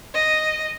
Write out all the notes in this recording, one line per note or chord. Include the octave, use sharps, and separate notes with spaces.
D#5